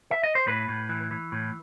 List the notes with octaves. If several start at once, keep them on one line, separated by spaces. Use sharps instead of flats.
E5
D#5
C5
A2 B4
A2
E3
E3
A2